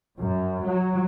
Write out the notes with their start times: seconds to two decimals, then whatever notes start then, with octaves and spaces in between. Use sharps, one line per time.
0.18 F#2
0.65 F#3